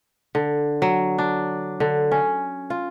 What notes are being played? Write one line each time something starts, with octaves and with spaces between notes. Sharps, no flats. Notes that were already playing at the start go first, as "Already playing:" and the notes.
D3
F#3
D4
D3
C#4
F4